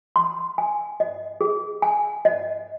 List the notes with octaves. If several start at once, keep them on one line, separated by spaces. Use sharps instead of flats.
C6
G#5
D#5
G#4
G#5
D#5